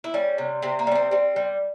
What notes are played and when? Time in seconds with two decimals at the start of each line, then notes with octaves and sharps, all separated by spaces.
0.04 E4
0.14 G3 C#4
0.38 C3
0.62 C3 C4
0.79 A#3
0.87 G3 C#4
0.95 C4
1.11 G3 C4
1.36 G3